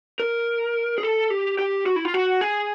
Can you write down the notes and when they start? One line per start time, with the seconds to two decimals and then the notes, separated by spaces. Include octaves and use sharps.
0.20 A#4
0.98 G#4
1.03 A4
1.30 G4
1.59 G4
1.86 F#4
1.96 E4
2.05 F4
2.14 F#4
2.41 G#4